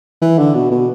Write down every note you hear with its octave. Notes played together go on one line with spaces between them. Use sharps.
E3
D3
B2
B2